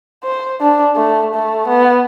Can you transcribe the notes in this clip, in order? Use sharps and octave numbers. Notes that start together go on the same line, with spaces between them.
C5
D4
A3
A3
B3